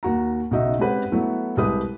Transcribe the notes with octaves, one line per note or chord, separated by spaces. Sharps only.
D#2 F#4 A#5
B1 C#3 D#4 F#4 D#5 E5
G#3 C4 C#4 G4 B4 F#5
F#3 A3 B3 E4
C2 G#3 G4 B4 D#6